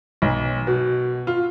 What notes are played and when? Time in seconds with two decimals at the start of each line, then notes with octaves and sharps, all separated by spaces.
0.22 B1
0.67 B2
1.27 F4